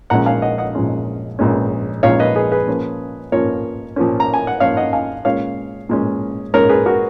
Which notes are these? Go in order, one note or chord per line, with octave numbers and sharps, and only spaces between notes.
A#1 A#2 G#3 C#4 F#5 A#5
F5 G#5
D#5 F#5
D#5 F#5
A#1 A#2 G#3 C#4
A#1 A#2 G#3 C#4
A#1 A#2 G#3 C#4 C#5 F5
B4 D#5
G#4 B4
G#4 B4
A#2 F3 A#3 C#4
A#2 F3 A#3 C#4 A#4 C#5
A#2 F3 A#3 C#4
A#5
G#5
F#5
A#2 F3 A#3 C#4 C#5 F5
D#5 F#5
F5 G#5
A#2 G#3 C#4 C#5 F5
A#2 G#3 C#4
A#2 G#3 C#4 A#4 C#5
G#4 B4
F#4 A#4